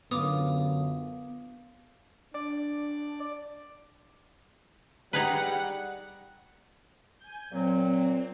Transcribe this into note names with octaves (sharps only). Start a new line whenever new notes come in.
F#2 D3 B3 F4 D6 D#6
D4 D5
G3 D#4 G#4 B4 F#5
G#5 G6
A#2 F#3 C4